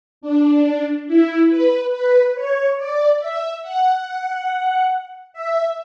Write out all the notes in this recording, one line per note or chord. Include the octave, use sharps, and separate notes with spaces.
D4
E4
B4
B4
C#5
D5
E5
F#5
E5